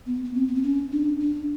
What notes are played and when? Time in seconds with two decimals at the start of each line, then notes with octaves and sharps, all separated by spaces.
0.06 B3
0.25 B3
0.35 C4
0.47 B3
0.55 C4
0.63 C#4
0.92 D4
1.20 D4